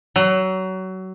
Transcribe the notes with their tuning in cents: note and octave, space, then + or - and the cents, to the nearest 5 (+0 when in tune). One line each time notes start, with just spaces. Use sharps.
F#3 +25